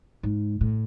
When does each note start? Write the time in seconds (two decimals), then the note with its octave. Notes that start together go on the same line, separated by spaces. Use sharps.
0.23 G#2
0.61 A2